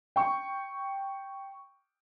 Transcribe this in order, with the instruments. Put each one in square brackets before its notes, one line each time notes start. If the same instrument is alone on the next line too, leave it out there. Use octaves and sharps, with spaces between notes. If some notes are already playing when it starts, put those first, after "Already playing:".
[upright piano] G5 C#6